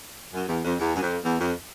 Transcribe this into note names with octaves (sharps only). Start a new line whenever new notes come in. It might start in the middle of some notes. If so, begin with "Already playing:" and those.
F#2
E2
F2
E2
F#2
F2
E2
F2